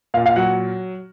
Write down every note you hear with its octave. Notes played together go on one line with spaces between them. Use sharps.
A#2 F5
F5
F#3 F#5